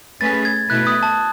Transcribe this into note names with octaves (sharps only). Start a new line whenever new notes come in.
A3 C#4 G#4 B4 A6
G#6
B2 A3 E4 B4 F#6
D#6
A5